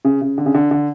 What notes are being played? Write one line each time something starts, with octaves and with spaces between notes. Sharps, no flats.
C#3
C#3
D3
C#3
D3
D3